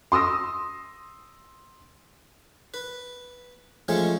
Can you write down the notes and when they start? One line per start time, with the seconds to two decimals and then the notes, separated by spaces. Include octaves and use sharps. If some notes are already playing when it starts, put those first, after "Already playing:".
0.12 C6 D#6 E6 A#6
2.74 B4
3.88 F3 G#3 A3 C#4 C#5